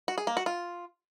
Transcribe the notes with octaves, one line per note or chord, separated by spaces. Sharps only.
F#4
G#4
A#3
F#4
F4